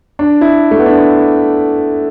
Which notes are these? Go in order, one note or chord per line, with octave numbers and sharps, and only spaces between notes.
D4
E4
A3
B3
D4